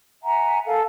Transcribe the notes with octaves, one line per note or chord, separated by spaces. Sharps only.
E5 F#5 G#5 A#5
A4 A#4 F5 G#5